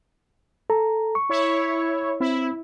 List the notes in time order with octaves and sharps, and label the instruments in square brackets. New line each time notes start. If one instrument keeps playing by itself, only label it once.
[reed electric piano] A4 A#5
C#6
[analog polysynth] E4 C#5
[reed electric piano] C4 [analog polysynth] E4